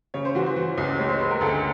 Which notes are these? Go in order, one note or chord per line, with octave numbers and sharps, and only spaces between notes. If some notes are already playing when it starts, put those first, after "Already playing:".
C#3 C#5
C5
E3 F#4
C5
E3
C#2
G#3 C#5
C5
G#3 B4
A#4
D2 A4